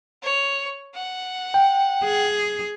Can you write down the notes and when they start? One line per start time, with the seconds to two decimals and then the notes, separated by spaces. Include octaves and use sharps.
0.22 C#5
0.95 F#5
1.54 G5
2.03 G#4